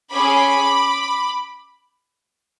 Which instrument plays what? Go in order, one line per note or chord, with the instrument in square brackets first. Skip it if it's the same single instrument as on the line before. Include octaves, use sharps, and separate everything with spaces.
[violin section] C#4 G#4 B5 D6